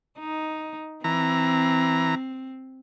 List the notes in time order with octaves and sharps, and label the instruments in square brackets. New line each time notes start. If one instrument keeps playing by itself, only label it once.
[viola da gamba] D#4
[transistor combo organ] E3 A#5 [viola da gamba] C4